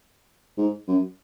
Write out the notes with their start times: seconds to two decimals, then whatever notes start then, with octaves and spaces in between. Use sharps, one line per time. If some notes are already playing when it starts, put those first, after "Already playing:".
0.57 G#2
0.88 F#2